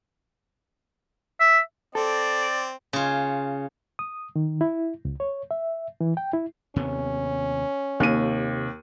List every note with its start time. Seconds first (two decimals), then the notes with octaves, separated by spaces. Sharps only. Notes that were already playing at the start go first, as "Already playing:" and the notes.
1.40 E5
1.95 C4 A4 D5
2.93 C#3 F4
3.99 D#6
4.36 D#3
4.61 E4
5.05 C#2
5.20 C#5
5.51 E5
6.01 E3
6.17 G5
6.33 E4
6.76 D#2 C3 B3 C#4
8.00 D#2 C3 D#7